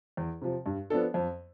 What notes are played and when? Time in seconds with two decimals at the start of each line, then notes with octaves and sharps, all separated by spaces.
0.17 E2
0.41 C3 F3
0.66 G2
0.90 F3 B3 D4 A4
1.14 F2